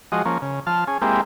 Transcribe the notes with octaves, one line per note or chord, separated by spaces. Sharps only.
F3 G#3 F#4 D#5
F3 A#3 C#4
C#3
F3 A5 F6
C#4 G#4
G#3 A#3 C4 E4 G4